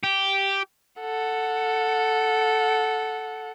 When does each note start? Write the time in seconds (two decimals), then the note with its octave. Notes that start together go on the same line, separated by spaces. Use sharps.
0.03 G4
1.00 A4 F#5